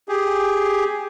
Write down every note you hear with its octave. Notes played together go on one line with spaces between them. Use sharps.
G4 G#4